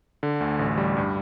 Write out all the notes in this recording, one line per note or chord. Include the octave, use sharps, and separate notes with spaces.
D3
D2
A1
G3
G2